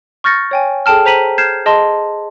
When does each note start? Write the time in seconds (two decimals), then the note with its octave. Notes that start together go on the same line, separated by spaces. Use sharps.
0.24 C#6 F6 G6 A6 A#6 C#7
0.51 C#5 G5 G#5
0.86 G#4 A4 G5 A5 F6
1.06 C5 A#5 B6 D#7 F#7
1.38 F6 G6 G#6 C7 E7
1.66 G#4 D#5 A5 C6